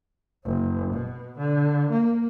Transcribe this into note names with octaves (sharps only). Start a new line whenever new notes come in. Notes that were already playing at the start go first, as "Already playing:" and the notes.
F#1
B2
D3
A#3